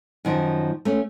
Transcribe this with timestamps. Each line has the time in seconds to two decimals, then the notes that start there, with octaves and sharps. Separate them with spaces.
0.25 F#2 D#3 F3
0.85 A3 C#4